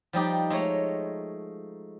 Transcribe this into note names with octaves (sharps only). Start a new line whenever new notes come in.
F3 G3 D#4 G4
G#3 A3 C#5 A#5